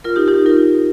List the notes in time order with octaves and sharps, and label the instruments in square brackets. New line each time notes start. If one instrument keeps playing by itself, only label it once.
[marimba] F4 A#4
D#4 G4
D#4 G4
F4 A#4